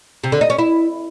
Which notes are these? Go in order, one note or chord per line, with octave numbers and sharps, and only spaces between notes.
C3
D3
D#4
C#4
E4